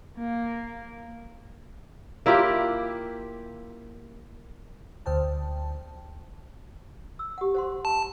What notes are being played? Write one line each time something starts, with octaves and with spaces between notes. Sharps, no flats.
A#3
A#3 E4 F4 G4
D2 C5 G5 A5
E6
G4 F#5
C5 F#5 C6
A5